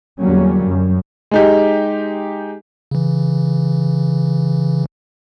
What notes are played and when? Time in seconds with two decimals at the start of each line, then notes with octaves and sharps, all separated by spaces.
0.22 E2 D3 F#3 G3 A#3 C#4
0.64 F#2
1.31 G#3 D#4 G4
2.91 C#3 E3